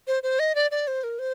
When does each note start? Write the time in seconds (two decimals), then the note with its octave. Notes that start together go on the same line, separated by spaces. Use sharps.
0.07 C5
0.23 C5
0.39 D#5
0.55 D5
0.71 D5
0.87 C5
1.04 A#4
1.19 C5